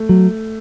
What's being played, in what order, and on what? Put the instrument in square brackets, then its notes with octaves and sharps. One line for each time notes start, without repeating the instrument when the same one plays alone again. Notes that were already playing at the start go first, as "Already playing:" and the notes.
Already playing: [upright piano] A3
[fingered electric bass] F#3